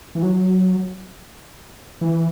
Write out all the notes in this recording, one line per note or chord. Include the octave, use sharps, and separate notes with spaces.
E3
F#3
E3